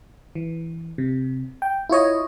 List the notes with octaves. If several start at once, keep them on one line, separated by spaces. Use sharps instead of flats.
E3
C3
G5
E4 F4 C#5 D#5